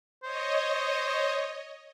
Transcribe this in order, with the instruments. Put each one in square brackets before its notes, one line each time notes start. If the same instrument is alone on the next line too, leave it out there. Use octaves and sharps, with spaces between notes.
[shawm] C5 [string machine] C#5 D#5